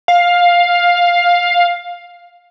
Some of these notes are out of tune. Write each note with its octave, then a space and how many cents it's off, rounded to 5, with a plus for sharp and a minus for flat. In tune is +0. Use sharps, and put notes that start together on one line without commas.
F5 +10